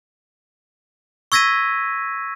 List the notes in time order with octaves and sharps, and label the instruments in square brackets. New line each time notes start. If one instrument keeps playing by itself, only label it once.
[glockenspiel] C#6 E6 G#6 A#6 B6 D#7